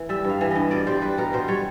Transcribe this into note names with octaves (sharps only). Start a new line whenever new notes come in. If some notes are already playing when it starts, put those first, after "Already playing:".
Already playing: E3
G3 E5
G2 F5
E3
G2 D#5
B2 D5
G3 C5
G3 B4
B2 A#4
B2 C5
G3 C#5